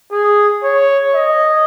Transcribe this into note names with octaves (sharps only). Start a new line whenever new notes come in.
G#4
C#5
D#5